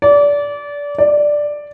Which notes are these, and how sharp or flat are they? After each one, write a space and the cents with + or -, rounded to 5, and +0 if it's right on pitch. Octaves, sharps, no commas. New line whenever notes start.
D5 -25
D5 +5